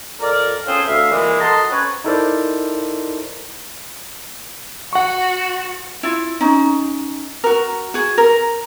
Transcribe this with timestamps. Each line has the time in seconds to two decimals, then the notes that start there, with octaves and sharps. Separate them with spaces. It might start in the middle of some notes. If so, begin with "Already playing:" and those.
0.21 F2 A#4 D5
0.67 C4 C#4 F4 G#4 A4 C5
0.86 D2 E5 F5
1.11 A#2 E3 G#3
1.40 F#4 A4 D#5 A5 A#5 C6
1.71 C4 C#4 B4 C#5
2.04 D#4 E4 A4 A#4 C5 D5
4.93 F#4 F#5 C#6
6.03 E4 F4
6.41 C#4 D#4
7.44 F#4 A#4
7.94 F#4 G#4
8.18 A#4